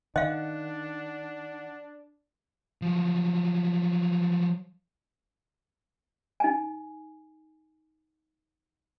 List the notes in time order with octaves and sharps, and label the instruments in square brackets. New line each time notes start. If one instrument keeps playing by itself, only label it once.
[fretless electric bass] D#3 [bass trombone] D4 [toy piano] D#5 F5 [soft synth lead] F#5
[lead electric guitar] F3 F#3
[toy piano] D#4 G#5